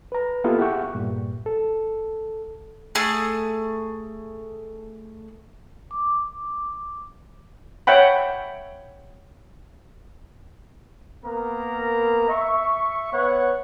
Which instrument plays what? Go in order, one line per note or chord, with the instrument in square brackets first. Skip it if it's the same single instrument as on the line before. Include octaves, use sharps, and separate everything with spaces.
[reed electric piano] B4 A#5
A#3 B3 E4 F4 G4 A4
G4 G#4 E5 F#5 G5 C#6
G2 A#2
A4
[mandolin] A3 G#4
[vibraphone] D6
[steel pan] C#5 E5 F#5 G5 B5
[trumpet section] A#3 B3 A#4 A#5
E5 C#6
B3 B4 C#5 F#5